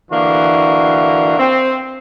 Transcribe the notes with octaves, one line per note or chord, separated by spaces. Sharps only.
D3 E3 A#3 D4 F#4
C4